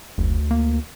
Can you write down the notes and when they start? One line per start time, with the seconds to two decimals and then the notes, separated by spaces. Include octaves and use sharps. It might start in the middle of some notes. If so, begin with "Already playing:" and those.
0.18 F#1 D2
0.51 A#3